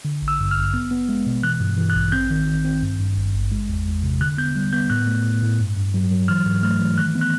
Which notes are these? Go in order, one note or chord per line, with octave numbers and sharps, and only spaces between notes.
D3
A1
E6
G2
F6
A1
B3
B3
G#3
B2
E3 F#6
G2
E3
F#6
A1
C4 G6
D#3
D#3
C4
G2
G2
G#1
G#1
G#3
E2
E2
C3
D3 F#6
B3 G6
G3
B3 G6
A2 F#6
A3
A2
A2
G2
G2
F#3
F#3
E3 F6
G#2
A3 F6
E3
D#3 F#6
B3
F#6